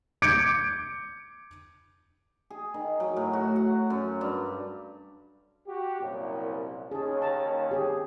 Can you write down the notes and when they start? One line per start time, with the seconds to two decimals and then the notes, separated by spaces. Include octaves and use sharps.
0.22 D6 G6 G#6 C#7 D7
2.50 G#4
2.74 D#3
3.00 F#3
3.16 A2
3.33 F#4
3.56 F#5
3.90 F#2
4.21 G2
5.67 F#4 G4
6.00 C2 F#2 A#2
6.91 D#2 C#4 G#4 A5
7.22 A5 A#5
7.71 G4 G#4